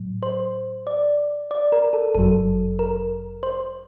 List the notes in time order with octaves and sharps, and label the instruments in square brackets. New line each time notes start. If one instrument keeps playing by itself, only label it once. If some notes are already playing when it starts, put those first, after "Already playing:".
Already playing: [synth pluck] A2 F#3
C5
D5
D5
A#4
A4
G1 F#2 F#3 A4
A#4
C5